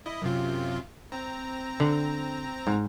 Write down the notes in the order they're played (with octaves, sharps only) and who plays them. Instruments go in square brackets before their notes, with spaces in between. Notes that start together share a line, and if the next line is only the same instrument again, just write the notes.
[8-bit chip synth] E4 D#5
F#2 C3 F4
C4 A#5
[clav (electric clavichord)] D3
G#2